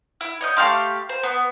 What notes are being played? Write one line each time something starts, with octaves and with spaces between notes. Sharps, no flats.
E4
C#5 D#5 G6
A3 G4 F5 C6
C5
B3